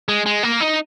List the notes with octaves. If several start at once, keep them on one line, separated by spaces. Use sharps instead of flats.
G#3
G#3
A#3
D#4